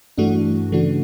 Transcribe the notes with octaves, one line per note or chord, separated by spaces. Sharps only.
G2 E3 A3 D4 F#4
C#3 E3 A3 D4 F#4